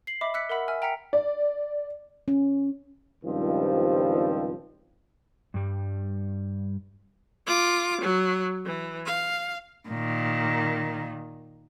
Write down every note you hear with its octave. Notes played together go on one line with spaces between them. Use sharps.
C7 F#7
D#5 E5 B5 D6
E6 F#6 B6 C#7
A#4 E5 F#5 B5 E6
E5 G#5 E6 F6
G5 A#5 F6 B6 C#7
D5
C#4
C#2 G2 D#3 F3 G3 C4
G2 G3
F4 D6
F#3
E3
F5
A#2 D#3